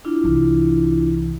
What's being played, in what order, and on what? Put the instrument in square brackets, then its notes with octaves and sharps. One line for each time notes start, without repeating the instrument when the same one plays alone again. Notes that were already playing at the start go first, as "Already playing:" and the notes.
[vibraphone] D4 E4 F4
[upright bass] C2 E3